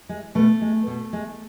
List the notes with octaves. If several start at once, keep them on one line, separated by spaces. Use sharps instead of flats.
G#3
B2 A3
G#3
B2
G#3